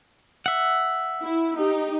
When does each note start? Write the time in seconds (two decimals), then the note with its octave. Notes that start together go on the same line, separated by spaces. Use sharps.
0.46 E5 F#5
1.23 E4
1.57 D#4 G4